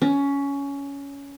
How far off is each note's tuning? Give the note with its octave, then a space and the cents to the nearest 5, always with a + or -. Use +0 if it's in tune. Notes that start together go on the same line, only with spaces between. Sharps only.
C#4 +15